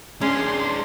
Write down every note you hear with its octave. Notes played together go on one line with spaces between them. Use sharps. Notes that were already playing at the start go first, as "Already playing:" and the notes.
G#3 C#4 D4 G#4 C6